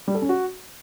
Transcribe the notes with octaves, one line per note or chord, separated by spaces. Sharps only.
G3
A4
C#4
F#4